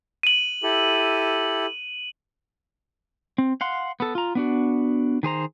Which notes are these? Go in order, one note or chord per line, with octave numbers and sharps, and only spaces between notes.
D#7 F#7
E4 G4 A4
C4
F5 F#5 C6
B3 A4
F4 A#5
B3 D4 F#4
D#3 G#4 C5 A#5